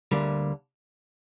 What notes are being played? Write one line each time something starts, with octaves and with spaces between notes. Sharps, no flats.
D2 D3 G3 A#3